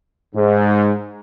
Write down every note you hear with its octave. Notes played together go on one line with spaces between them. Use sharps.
G#2